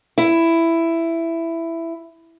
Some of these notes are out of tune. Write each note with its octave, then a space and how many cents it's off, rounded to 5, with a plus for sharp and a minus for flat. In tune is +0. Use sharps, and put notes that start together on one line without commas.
E4 +10